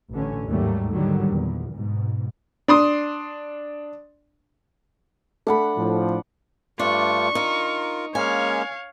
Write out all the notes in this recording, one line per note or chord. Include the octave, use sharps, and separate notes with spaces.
A1 D3 C#4
D#2 G#2 F#3 G3 A3 A#3
G#2 D3 D#3 F#3 G3
E2 A#2
G#2 B2
D4 C6 D#6
A3 D4 F#5 B5
A2 F3
G2 A3 D4 F4 C#6
D#4 F4 A#4
G#3 A#3 C#4 C#5 F5 G#5